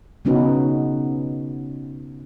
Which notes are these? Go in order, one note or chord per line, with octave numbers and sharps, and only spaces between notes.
C#3 B3 C#4 D#4 F#4 B4